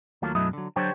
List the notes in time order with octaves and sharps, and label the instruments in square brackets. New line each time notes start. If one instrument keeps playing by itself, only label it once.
[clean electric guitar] D#2 F#3 A3 A#3 F4
B1 F#2 F#3 A3 E4 D#5
D3 F#3
D3 F#3 D4 G4 C5 C#5